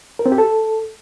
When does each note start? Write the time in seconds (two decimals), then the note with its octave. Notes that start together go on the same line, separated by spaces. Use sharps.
0.19 A#4
0.26 C4
0.32 G4
0.38 A4